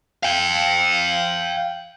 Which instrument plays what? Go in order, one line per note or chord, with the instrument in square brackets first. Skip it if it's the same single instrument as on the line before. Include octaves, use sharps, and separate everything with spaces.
[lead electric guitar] F5 G5